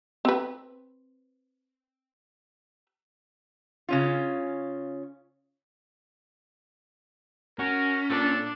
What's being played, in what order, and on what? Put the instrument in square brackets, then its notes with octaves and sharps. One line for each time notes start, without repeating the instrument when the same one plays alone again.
[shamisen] C4 B4
[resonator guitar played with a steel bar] C#3 C#4 F4
[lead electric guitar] C#4 [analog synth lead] F#4 [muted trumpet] A#4
[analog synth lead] A#2 [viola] D4 [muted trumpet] A4